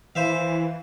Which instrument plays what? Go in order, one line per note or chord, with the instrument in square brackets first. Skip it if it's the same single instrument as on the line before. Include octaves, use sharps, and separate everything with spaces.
[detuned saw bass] E3 [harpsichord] C5 E5 F5